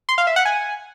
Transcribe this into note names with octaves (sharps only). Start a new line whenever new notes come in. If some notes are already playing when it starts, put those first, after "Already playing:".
C6
F5
E5
F#5
G#5